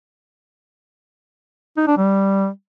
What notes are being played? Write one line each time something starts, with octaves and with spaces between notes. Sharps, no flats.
D#4
D4
G3